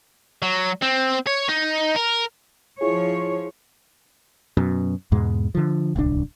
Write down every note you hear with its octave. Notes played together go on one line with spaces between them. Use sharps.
F#3
C4
C#5
D#4
A#4
F3 E4 F4 G#4 C#5
F#2 B2
E2 G#2 B2 G#3
D3 F3
D1 C2 D4